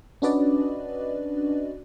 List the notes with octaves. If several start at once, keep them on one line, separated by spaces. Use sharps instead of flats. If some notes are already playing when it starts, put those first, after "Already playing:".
C#4 D4 F#4 B4 D5 D#5